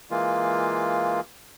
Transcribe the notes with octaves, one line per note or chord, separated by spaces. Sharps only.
E3 G#3 A#3 F4